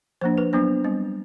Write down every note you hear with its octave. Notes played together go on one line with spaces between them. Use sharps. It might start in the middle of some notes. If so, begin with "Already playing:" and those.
F3 A#3 D4 C5
B4
F#3 B3 D4 C5
G3 C4